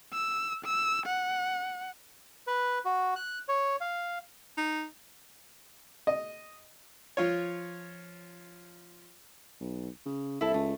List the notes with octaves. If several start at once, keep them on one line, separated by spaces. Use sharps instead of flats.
E6
E6
F#5
B4
F#4
F#6
C#5
F5
D#4
D#5
F3 F4 C#5
B1
C#3
C2 E4 A4
C#2 A3